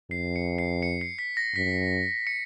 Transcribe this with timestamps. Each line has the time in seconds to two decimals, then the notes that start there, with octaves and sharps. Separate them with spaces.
0.11 F2 C7
0.36 C#7
0.58 C7
0.83 C#7
1.01 C7
1.19 B6
1.37 A#6
1.55 F#2 B6
2.27 C#7